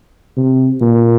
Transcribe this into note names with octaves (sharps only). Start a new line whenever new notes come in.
C3
A#2